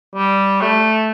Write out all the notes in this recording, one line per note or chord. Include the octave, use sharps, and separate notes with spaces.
G3
A3